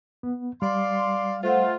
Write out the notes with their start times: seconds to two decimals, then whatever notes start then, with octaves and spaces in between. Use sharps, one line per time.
0.23 B3
0.62 G3 D5 F5 C6
1.43 A3 F4 C5 F#5